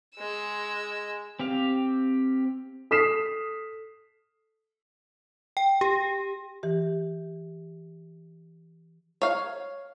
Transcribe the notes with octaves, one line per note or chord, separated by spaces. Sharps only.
G#3 E6
C4 G4 F5
A4 D#6 F6 B6 C7 E7
G5
G4
E3 G4
C#5 F5